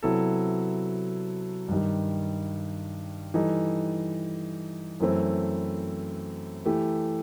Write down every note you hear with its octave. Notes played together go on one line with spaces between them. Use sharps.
C3 F#3 B3 E4 A4
G2 D#3 G3
E3 G3 D#4 A4
F#2 E3 A3 C4 E4
E3 A3 E4 G4